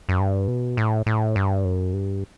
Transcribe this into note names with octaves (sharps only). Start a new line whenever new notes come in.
F#2
G2
B2
A2
A2
G2
F#2
G2